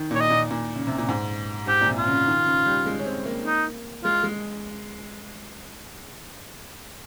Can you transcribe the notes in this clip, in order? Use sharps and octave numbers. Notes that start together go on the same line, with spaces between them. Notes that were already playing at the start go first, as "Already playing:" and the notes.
Already playing: D#3
A#2 C#5
D#5
A#2
A#2
C#3
C3
A#2
G#2
G#2 G4
A#2
C3
F4
C#3
D#3
C#3
G3
G#3
C#4
C4
A#3
D#4
G#3 F4
G#3